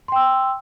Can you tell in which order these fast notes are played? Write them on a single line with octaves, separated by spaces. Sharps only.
C6 G5 E6